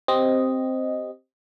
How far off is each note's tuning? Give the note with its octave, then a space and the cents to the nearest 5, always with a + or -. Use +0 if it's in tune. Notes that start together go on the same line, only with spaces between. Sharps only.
C4 +0 G4 -10 D#5 +0